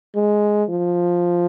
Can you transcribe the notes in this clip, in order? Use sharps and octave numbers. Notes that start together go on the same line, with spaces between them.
G#3
F3